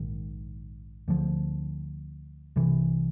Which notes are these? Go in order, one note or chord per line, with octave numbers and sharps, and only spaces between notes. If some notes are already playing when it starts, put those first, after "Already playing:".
Already playing: A#1 G#2 D#3
D2 D3 F3
C2 C3 E3